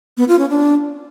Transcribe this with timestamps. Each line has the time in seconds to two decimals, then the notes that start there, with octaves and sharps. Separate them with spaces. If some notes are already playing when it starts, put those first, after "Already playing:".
0.17 B3
0.28 F4
0.39 C#4
0.50 D4